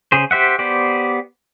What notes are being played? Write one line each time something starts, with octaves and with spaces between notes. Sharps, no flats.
C#3 G#4 C5
G4 C5 E5 F#5
B3 G4 C5 D5